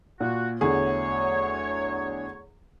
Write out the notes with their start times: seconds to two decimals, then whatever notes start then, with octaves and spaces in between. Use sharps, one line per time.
0.21 A#2 F#4
0.61 E2 D3 F#3 A3 G#4 C#5